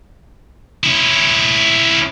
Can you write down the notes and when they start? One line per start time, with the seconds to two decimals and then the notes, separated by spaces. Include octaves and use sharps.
0.83 C#4 E4